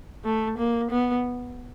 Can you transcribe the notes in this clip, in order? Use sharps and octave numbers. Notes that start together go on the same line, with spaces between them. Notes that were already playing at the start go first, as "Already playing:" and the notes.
A3
A#3
B3